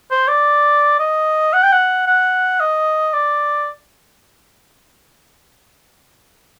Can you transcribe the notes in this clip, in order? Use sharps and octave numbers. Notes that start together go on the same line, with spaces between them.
C5
D5
D#5
F#5
G5
F#5
F#5
D#5
D5